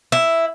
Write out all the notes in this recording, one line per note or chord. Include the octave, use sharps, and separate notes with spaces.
E4